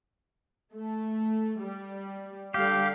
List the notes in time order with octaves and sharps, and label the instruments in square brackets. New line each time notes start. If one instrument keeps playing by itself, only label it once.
[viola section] A3
G3
[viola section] D3 G3 F5 [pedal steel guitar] G4